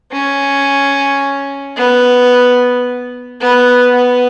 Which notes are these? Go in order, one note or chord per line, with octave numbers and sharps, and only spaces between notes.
C#4
B3
B3
B3